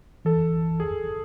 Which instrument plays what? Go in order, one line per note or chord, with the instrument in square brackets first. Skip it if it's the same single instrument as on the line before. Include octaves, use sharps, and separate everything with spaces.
[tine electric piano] E3 [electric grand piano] A4
[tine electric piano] B1
[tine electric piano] G1 [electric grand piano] G#4